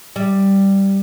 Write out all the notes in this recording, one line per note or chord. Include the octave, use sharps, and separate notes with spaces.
G3